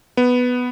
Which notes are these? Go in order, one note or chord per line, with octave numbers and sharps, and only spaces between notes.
B3